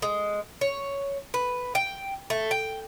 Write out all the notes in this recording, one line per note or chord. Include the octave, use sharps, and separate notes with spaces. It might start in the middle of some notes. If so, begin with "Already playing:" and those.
G#3
C#5
B4
G5
A3
G5